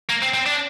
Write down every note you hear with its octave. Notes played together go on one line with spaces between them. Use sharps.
A#3
C4
C4
D4